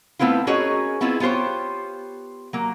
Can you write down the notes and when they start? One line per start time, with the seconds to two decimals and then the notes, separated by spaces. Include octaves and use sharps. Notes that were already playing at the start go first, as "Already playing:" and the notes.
0.19 A3 B3 C4 E4 F4
0.47 C#4 F#4 G#4 A#4 C#5 D#5
1.01 B3 C4 E4 F4 G#4
1.20 B3 F4 G4 C5 C#5
2.53 F#3 A#3